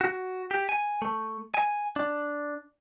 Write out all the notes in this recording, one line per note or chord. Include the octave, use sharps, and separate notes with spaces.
F#4
G4
G#5
A3
G#5
D4